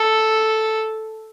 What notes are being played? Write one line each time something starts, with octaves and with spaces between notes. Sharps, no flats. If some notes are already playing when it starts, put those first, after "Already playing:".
Already playing: A4